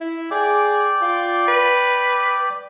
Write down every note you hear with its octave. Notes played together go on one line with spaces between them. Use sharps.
E4
G#4 D5 G5 D6
F4
B4